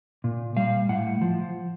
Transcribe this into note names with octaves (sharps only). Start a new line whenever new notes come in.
A#2
G3 F5
A2 F#5
F3